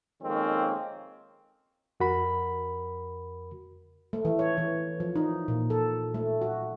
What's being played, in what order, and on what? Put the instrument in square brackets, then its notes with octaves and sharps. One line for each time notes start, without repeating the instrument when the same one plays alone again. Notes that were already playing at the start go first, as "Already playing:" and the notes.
[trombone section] F2 D#3 G#3 A#3 C4 C#4
[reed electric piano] F2 F#4 A#4 B5
[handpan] A3
E3
C#5
E3
F3
D#4
A#2
A4
A3
F#4